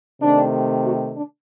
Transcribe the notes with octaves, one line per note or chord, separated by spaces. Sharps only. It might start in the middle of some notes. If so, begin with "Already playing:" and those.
C3 D#3 A3 D4
F#4
D4